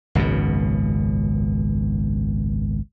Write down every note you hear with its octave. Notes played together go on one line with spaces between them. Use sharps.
G#1 C#2 F#2 B2